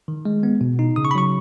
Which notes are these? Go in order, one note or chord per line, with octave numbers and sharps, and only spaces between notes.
D#3
G#3
B3
B2
D#4
C#3 D#6
C#6
B5
F#3 C#6